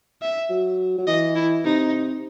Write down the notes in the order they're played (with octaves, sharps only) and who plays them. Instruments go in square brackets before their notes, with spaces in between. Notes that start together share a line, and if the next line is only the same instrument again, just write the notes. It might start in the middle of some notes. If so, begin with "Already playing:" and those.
[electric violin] E5
[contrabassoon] F#3
F#3
[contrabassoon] E3 [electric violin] D#5
[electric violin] E4
[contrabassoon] C3 [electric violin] D#4